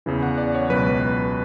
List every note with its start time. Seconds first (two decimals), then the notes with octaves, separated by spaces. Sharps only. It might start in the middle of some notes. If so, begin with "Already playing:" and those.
0.06 E2 C#3 E3
0.23 F#5
0.38 D5
0.55 C#5
0.70 C#2 B2 F#3 B4